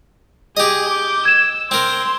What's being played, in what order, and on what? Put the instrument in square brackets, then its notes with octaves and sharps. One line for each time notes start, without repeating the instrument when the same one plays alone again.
[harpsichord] G4 D#5 [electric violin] G#4
[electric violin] D6 G6
[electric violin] E6 [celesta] G#6 E7
[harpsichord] C4 A#4 [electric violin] C6